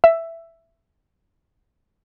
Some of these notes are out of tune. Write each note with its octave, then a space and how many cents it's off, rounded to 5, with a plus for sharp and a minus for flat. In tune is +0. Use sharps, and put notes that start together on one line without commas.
E5 +10